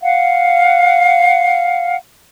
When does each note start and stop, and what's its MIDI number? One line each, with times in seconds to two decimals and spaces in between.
0.02 1.96 77
0.02 1.96 78